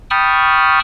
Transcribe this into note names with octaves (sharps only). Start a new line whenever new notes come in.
G5 A5 B5 C#6 D#6 F6